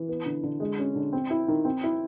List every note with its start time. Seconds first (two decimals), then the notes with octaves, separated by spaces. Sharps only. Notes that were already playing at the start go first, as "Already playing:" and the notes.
Already playing: E3
0.08 B3
0.26 D3
0.43 D3
0.60 G#3
0.79 C#4
0.96 D3
1.13 C4
1.30 E4
1.48 D#3
1.65 C4
1.83 E4